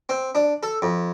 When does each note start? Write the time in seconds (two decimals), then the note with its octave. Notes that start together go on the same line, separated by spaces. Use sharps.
0.09 C4
0.35 D4
0.63 A4
0.82 F2